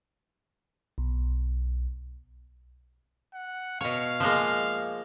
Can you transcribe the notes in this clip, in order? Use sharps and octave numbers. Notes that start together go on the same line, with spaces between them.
B1
F#5
B2 C#5 F5
F3 G#3 A#3